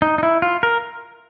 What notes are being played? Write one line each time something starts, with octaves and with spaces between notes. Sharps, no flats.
D#4
D#4
E4
F4
A#4